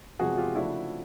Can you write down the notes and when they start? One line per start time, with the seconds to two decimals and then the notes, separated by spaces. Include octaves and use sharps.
0.19 E2 C3 F3 G#3 F#4 G#4
0.38 F4 G4
0.55 C#3 F3 A3 D4 E4 F#4